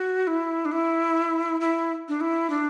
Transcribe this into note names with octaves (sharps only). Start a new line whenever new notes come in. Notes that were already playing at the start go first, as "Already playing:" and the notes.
Already playing: F#4
E4
D4
E4
E4
D4
E4
D4